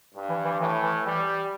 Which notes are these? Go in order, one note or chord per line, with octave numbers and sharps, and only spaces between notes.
G2
E3
E3
A2 E3
E3
E3 G3